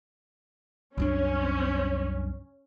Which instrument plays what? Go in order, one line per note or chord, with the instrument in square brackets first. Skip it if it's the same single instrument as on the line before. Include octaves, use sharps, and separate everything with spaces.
[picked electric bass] C2 F#2 D4 [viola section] C#4